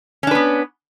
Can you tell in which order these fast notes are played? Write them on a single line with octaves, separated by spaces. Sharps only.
C#4 D4 B4 B3